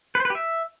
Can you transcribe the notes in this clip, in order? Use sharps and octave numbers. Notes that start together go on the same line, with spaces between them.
B4
C5
B4
G4
E5